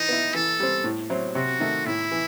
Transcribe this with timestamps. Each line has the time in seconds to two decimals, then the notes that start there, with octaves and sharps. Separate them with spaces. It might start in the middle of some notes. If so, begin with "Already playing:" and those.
Already playing: E3 D#4
0.09 B3 E4
0.34 E3 A4
0.60 G3 C4
0.84 A2
1.10 F#3 C4 E4
1.35 C3 F#4
1.60 D#3 A3
1.86 A2 E4
2.12 E3